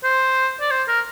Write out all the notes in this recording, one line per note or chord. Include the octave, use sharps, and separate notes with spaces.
C5
D5
C5
A#4